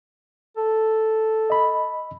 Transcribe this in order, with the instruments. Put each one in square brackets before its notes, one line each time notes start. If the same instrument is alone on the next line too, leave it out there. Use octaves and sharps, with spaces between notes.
[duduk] A4
[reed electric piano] D#5 B5